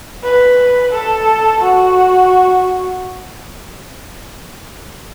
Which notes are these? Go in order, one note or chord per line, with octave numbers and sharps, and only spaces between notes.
B4
A4
F#4